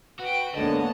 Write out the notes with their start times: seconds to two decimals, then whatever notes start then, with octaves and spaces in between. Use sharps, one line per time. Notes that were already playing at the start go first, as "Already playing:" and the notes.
0.20 F#4 B4 G5
0.55 D3 G#3 A#3 B3 C#5 D#5 A5